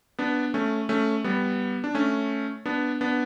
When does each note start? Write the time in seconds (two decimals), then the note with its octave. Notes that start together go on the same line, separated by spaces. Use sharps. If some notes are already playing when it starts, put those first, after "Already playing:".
0.19 B3 D4
0.54 A3 C#4
0.89 A3 C#4
1.24 G3 B3
1.84 D4
1.95 A3 C#4
2.66 B3 D4
3.01 B3 D4